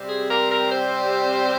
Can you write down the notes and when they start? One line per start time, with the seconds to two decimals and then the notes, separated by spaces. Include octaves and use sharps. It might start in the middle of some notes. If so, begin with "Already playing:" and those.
Already playing: C3 G3 C4
0.09 G#4
0.29 A#4
0.50 A#4
0.71 C5